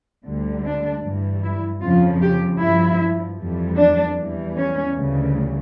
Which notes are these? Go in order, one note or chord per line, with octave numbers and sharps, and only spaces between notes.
D2 D3 G3
D4
G2 E3 G3
E4
F2 C#3 F3 F4
G4
G2 F3 E4
F2 E3 G3
D4
E2 E3 G3
C#4
D2 C#3 E3 G3